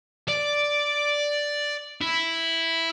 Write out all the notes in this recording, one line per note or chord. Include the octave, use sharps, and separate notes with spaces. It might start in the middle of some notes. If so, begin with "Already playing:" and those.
D5
E4